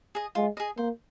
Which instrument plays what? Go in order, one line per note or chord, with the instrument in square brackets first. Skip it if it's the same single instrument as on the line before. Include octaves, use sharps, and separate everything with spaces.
[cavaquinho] G#4 D#5
[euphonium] G#3 [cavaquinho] F4
[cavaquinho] G#4 D#5
[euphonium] A#3 [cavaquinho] C5